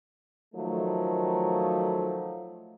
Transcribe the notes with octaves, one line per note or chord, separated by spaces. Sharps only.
D#3 F3 F#3 A3